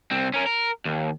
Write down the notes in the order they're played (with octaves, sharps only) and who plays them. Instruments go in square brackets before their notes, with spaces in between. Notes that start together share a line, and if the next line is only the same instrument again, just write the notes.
[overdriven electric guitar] C2 C4
C#4 A#4
A#4
D#2